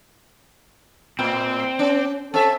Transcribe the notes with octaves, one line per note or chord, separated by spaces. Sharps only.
A2 C4
C#4
C4 A4 E5